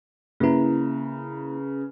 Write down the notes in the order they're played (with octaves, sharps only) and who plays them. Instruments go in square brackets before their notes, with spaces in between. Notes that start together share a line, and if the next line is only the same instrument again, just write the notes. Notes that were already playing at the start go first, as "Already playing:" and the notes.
[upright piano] C#3 B4 A#5 [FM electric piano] A#3 E4